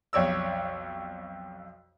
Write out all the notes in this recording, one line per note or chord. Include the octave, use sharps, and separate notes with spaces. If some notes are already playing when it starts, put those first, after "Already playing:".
B1 F2 C#5 D5 E6